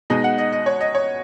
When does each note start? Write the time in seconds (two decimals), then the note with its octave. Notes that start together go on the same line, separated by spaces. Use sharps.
0.10 B2 G#3 D#4 D#5
0.24 F#5
0.38 D#5
0.52 D#5
0.66 C#5
0.81 D#5
0.95 C#5